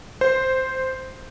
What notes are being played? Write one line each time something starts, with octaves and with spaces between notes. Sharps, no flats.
C5